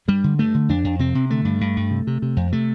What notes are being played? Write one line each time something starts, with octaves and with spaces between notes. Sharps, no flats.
G2 G3
D3
G2 A3
D3
F2 D4
F2
C3 C4
C3
D3 A3
G2
G2
G2
C3
C3
C3
F2
C3 A3